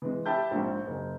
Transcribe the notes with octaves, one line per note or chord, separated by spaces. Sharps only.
E3 G#3
G4 E5 A5 B5 G6
A#1 G#2
F#1